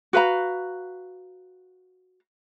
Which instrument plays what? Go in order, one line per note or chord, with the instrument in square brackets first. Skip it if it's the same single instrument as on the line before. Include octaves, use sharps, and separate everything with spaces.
[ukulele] F#4 B4 F5 A#5